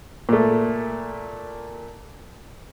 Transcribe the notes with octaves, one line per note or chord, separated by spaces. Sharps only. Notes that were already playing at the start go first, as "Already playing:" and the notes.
A#2 A3